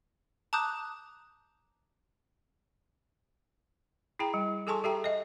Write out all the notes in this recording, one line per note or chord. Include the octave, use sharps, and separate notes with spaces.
A5 A#5 D6 D#6 F#6 G6
E4 G#4 G5 A#5
G3
G#4 A4 G#5 A5 C6 C#6
G4 A4 E5 G5 A#5
D#5 E5